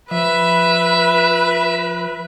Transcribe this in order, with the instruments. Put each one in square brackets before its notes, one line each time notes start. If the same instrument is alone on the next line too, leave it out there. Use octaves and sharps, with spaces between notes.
[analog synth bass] F3 [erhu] B4 [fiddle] E5